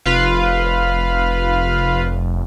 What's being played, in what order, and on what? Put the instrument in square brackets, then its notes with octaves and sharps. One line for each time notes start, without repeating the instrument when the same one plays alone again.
[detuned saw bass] F1 [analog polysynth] F4 B4 F5